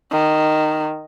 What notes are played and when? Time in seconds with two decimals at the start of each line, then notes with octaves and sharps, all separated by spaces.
0.12 D#3